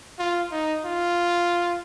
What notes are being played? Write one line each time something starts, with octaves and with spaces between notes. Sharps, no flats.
F4
D#4
F4